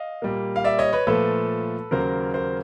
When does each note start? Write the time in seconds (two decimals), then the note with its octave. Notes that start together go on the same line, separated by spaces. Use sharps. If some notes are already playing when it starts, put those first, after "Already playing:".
Already playing: D#5 F5
0.22 A#2 G3 A#3
0.56 F5
0.64 D5 E5
0.79 C#5 D#5
0.93 B4 C#5
1.07 A#2 F3 A3 A4 B4
1.91 D#2 C#3 F#3 A#3 A#4 C5
2.34 A#4 C5